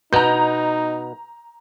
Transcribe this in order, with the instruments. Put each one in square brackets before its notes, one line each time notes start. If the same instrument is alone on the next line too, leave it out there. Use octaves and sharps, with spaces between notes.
[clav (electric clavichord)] B2 B3 [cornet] D#4 [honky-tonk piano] A#5 G6